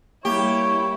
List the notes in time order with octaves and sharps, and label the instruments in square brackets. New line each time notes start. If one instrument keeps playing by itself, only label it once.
[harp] G3 A#3 [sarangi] E4 [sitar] G4 [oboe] C#5